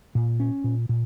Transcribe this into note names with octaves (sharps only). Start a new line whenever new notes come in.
A#2
C#4
A#2
A#2